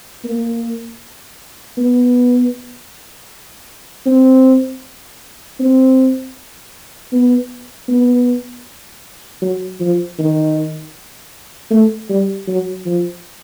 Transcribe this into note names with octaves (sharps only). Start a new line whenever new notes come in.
A#3
B3
C4
C4
B3
B3
F#3
F3
D#3
A3
G3
F#3
F3